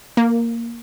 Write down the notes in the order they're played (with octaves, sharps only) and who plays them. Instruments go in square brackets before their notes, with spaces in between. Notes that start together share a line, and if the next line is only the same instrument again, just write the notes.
[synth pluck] A#3